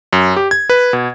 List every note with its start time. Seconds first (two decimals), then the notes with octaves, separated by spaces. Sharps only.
0.13 F#2
0.36 G4
0.51 G#6
0.70 B4
0.93 B2